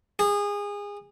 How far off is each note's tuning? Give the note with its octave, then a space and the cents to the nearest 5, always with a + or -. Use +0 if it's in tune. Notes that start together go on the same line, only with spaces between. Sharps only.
G#4 -25